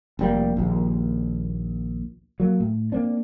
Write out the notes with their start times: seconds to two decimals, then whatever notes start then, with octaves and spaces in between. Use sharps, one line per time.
0.19 F1 G3 A#3
0.57 A#1 D#2
2.40 F#3 A#3
2.60 A2
2.92 A#3 C4 D4